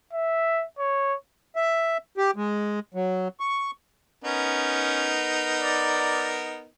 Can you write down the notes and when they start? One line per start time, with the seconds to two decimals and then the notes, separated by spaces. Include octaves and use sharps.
0.13 E5
0.79 C#5
1.56 E5
2.17 G4
2.36 G#3
2.94 F#3
3.40 C#6
4.24 B3 C#4 D#4 A#4
5.61 D5